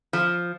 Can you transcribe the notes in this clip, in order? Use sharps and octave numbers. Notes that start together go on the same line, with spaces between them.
F3